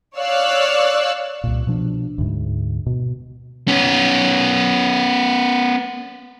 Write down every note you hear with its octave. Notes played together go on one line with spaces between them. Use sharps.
C#5 D5 F5 E6 F#6
C2 A#2
B2 F3 D4
D2 G#2
B2
B3 C#4